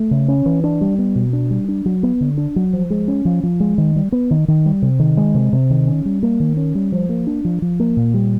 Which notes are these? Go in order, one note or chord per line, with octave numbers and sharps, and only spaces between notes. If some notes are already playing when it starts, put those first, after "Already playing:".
Already playing: A3
C#3
C#4
E3
D4
G3
B3
B2
D4
G3
D4
F#3
B3
D3
D4
F#3
F3
G#3
C#4
F3
F3
G#3
D#3
G3
B3
D#3
D#3
G3
C3
D#3
G#3
C3
C3
D#3
C#4
G3
A#3
D#3
C#4
G3
F3
A#3
D4
F3
F3
A#3
A#2
G3